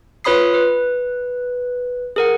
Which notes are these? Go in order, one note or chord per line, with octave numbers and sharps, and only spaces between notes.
F4 B4 C#5 B5 D#6 C7
B4
G#4 A#4 F#5